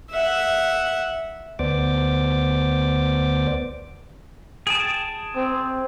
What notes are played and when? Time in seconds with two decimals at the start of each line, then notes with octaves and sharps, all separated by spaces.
0.11 E5 F#5
1.59 D2 B3 C5 D5 D6
4.67 G#4 G5 A5
5.36 C4